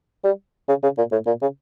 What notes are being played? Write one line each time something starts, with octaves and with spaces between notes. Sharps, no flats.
G3
C#3
C#3
A#2
A2
A#2
C#3